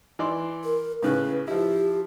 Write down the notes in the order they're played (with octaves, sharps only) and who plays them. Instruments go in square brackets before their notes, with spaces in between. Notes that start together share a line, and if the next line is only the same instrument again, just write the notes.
[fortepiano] E3 D5 C6
[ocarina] A#4
[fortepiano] A2 C#3 F#6 [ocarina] B4
[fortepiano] F3 E4 [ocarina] G4